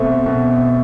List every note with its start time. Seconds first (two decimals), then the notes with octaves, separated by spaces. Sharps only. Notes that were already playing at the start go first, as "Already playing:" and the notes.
Already playing: B2 A3 C4
0.26 B2